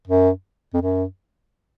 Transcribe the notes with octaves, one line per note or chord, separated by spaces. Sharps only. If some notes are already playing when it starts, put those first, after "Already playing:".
F#2
F2
F#2